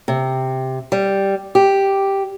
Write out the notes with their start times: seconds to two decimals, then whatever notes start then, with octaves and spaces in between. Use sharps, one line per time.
0.08 C3
0.92 G3
1.55 G4